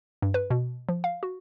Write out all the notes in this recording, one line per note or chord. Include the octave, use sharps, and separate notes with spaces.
G2
B4
B2
F3
F5
F#4